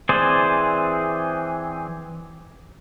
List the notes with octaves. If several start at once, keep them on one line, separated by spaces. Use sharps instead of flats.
E3 C4 G#4 C5 D5